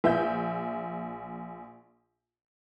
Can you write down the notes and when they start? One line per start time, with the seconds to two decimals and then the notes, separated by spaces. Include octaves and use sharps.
0.04 A#1 E5 G6